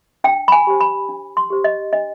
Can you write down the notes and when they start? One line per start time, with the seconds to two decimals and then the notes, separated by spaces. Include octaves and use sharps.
0.24 D4 G5
0.48 B5
0.52 G#5
0.67 G4 C5
0.80 B5
1.09 D4
1.37 C6
1.50 G4 C5
1.64 D#5
1.93 D4 D#5